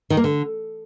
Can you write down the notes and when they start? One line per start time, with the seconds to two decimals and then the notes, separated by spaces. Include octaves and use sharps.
0.10 D#3
0.17 A#3
0.24 D3